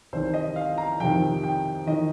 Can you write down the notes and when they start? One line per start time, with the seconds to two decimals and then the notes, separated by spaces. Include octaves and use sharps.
0.13 C2 C3 D#3 C5
0.34 D#5
0.56 F5
0.78 A#5
1.00 F2 C3 D#3 G5
1.44 G5
1.87 D#3 D#5